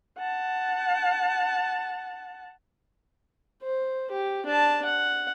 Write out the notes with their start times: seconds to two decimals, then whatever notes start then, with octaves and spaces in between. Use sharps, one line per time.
0.18 F#5 A5
3.63 C5
4.11 G4
4.46 D4 A5
4.85 F#5